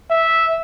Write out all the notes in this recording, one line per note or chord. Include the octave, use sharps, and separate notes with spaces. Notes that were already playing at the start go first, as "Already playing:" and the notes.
E5